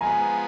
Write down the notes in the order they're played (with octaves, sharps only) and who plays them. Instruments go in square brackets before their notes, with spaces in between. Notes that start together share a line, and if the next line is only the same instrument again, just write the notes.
[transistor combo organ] F3 G#3 B3 [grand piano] G#5 A#5